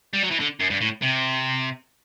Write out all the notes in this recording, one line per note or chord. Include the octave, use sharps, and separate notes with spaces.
G3
F#3
E3
D3
F#2
G2
A2
C3